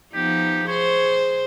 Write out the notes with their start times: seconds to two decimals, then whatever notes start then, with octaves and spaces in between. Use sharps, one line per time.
0.14 F3 B3 D#4 G4
0.67 G#4 C5 C#5